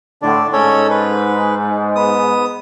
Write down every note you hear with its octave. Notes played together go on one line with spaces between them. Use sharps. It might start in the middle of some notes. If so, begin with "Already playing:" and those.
A2 D3 D4
G#2 C#4 A4 C#5
B4
B3 D#6